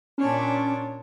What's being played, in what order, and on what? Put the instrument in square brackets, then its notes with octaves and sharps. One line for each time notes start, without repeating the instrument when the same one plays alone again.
[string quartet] A#2 D4 C#5 [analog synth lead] C#4